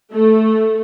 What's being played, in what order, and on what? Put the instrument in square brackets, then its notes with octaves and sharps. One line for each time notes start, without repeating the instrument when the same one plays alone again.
[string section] A3